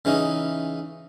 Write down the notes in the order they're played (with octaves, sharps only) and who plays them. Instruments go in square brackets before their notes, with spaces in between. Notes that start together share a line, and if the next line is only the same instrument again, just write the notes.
[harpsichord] C#3 E3 C#4 D#4